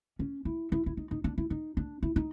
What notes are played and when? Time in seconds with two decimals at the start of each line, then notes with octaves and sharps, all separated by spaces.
0.19 C#4
0.45 E4
0.72 E4
0.86 E4
0.97 D#4
1.11 D#4
1.24 D4
1.38 E4
1.50 D#4
1.77 D4
2.03 E4
2.16 D#4